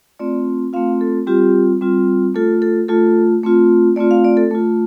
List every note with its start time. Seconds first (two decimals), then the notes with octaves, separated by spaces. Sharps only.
0.19 A3 C4 F4 D5
0.73 A3 C4 F4 F5
1.01 A4
1.27 G3 C4 F4 G4
1.81 G3 C4 F4
2.35 A3 F4 A4
2.62 A4
2.88 A3 F4 A4
3.43 A3 C4 F4
3.96 A3 C4 F4 D5
4.11 F5
4.24 D5
4.37 A4
4.51 A3 F4